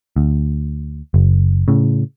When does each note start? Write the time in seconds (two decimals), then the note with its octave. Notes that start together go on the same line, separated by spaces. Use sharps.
0.16 D2
1.14 F#1
1.68 A2 C#3